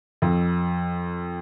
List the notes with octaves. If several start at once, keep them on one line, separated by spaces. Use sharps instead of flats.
F2